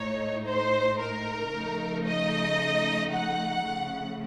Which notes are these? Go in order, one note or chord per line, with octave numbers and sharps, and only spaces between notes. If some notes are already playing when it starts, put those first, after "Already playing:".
Already playing: A2 A3 D#4 C#5
C5
A#4
C#3 F3 A3 D#4
D#5
F#5
C#3 F3 A3